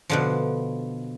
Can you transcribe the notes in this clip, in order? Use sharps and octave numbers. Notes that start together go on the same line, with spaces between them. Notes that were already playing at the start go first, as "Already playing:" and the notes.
B2 D3 F3